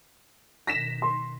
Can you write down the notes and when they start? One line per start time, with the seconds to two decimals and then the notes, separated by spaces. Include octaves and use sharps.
0.67 B2 D#3 A#6 B6 E7
1.02 C6